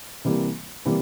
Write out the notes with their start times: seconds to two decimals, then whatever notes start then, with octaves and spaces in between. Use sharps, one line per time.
0.25 C3 E3 G3 A#3
0.85 C3 E3 G3 A#3